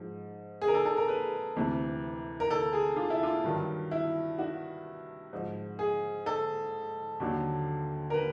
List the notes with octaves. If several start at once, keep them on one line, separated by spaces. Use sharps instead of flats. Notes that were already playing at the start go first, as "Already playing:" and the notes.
Already playing: G#2 F3
G#4
A#4
A4
A4
A#4
B4
D2 C3 E3
A#4
A4
G#4
F4
E4
F4
G2 D#3 F#3
E4
F#4
G#2 F3
G#4
A4
D#2 D3 F#3
A#4
B4